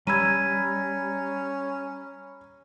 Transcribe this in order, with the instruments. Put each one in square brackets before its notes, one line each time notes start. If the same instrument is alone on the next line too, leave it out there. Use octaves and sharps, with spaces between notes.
[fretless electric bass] G3 [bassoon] C#4 [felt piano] A#5 B5 E6 [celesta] G#6 D#7